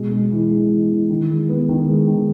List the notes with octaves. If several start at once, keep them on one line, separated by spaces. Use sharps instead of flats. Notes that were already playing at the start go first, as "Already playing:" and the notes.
Already playing: B2 G#3
G#3
E3
G#3
E3
E3
D#3
G#3
B3
D#3
G#3
D#3